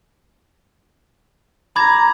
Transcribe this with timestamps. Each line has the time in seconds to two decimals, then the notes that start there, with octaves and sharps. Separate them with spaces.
1.76 A#5 B5 D6 G#6